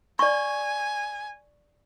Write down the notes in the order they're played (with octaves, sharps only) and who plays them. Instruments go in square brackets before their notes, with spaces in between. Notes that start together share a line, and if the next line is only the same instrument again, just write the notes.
[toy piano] D5 C#6 [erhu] G#5